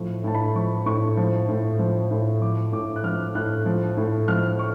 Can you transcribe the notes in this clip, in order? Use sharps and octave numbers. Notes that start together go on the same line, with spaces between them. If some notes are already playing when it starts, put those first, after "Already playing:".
Already playing: A2 F3
A2 A5
B5
F3 C#6
A2 C#6
F3
A2
F3
A2
F3 D6
A2 D6
F#6
F3 F6
A2 F#6
F3
A2
F3 F6
C#6